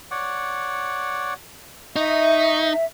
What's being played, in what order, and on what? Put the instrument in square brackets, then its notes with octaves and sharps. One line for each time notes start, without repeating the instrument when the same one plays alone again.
[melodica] C#5 D5 F#5
[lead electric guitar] D#4 [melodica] D#5 C#6 [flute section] E5